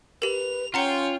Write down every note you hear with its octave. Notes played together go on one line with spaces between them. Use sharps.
G4 A#4 B4 F7
C#4 F4 C#5 F#5 G5 A#5 C#7